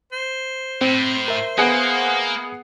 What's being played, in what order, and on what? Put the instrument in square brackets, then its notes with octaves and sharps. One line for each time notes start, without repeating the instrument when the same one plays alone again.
[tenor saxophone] C5
[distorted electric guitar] A2 [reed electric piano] C4
[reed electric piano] A#4 E5
[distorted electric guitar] A#3 [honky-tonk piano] B3 G#4 F#5